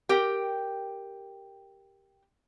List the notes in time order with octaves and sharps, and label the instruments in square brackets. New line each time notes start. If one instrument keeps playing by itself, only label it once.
[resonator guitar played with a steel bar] G4 A#4 G5